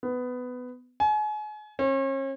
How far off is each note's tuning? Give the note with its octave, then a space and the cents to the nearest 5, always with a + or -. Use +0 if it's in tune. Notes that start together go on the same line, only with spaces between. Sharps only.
B3 +15
G#5 +35
C#4 -40